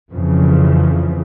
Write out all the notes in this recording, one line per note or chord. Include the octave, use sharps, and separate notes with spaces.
F2 C#3 E3 F3